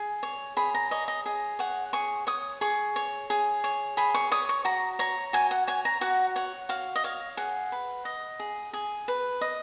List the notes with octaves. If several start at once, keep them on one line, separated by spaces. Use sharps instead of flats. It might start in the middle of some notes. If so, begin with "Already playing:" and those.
Already playing: G#4
C#5
G#4 B5
A#5
C#5 D#5
D#5
G#4
C#5 F#5
G#4 C#6
C#5 D#6
G#4 C#6
C#5
G#4
C#5
G#4 B5
C#6
C#5 D#6
C#6
F#4 A#5
C#5 A#5
F#4 G#5
F#5
C#5 G#5
A#5
F#4 F#5
C#5 F#5
F#4 F5
D#5
C#5 F5
G#4 F#5
B4
D#5
G#4
G#4
B4
D#5